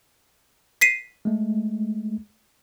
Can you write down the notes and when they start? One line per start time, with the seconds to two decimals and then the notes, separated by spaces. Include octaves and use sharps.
0.81 B6 C7 D#7
1.25 G#3 A3